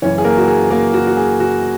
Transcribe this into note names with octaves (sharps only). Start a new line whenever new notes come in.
F#1 F#2 E3 C#4 C#5
G#4
A#3 A#4
F#4
G#4
A#3 A#4
F#4
F#4
G#4
F#4